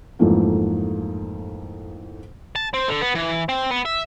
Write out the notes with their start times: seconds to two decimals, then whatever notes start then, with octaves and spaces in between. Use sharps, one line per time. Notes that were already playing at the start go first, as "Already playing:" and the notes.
0.19 F2 G#2 E3 F3 A3 A#3
2.56 A5
2.74 C4
2.88 D3
3.01 B3
3.15 E3
3.49 C4
3.71 B3
3.85 E5